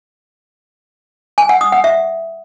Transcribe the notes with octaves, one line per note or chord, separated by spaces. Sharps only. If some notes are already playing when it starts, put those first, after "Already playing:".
G#5
F#5
D#6
F#5
E5